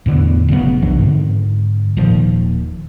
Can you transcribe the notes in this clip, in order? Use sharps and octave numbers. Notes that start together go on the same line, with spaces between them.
E2 A2 D3 B3
F1 C#3 F#3 B3
B1 E3 F#3 D4
G#2 D3 C4
D#1 A#2 D#3 F3